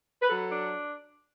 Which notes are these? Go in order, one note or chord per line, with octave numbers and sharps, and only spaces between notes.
B4
F#3 A4
D4